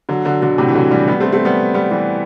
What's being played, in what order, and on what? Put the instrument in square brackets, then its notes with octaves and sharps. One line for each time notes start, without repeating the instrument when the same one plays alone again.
[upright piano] D3 F#3
D3 F#3
B2 D3
A2 C3
E3
D3 F#3
E3 G3
G3 B3
A3 C4
A3 C4
G3 B3
G3 B3
E3 G3